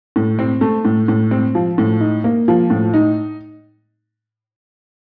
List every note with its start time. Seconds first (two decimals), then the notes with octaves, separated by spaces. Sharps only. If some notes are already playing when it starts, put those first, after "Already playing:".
0.16 A2
0.39 C4
0.61 A3
0.85 A2
1.08 A2
1.31 C4
1.55 F3
1.78 A2
2.00 D#4
2.24 A#3
2.48 F3
2.70 A2
2.94 D#4